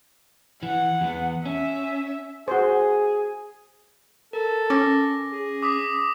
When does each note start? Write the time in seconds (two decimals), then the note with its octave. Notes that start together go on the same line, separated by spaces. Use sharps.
0.63 E3 F#5
1.01 E2 B3
1.45 C#4 E5
2.48 F#4 G#4 C5
4.33 A4 A#4
4.70 C#4 D6 A#6
5.32 G#4
5.63 D6 D#6 B6